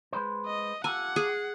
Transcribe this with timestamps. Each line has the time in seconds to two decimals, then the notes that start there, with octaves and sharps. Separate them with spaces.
0.13 G#3 B4 C5
0.46 D#5
0.84 F4 G4 A4 F#5 G#5
1.16 G#4